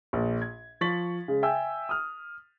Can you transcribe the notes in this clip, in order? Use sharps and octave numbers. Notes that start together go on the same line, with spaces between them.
A#1
G#6
F3 C#6 A6 B6 F#7
C#3 G#3
E5 G5 G#5 E6
D#6 F6